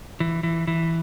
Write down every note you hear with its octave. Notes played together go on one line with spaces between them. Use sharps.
E3
E3
E3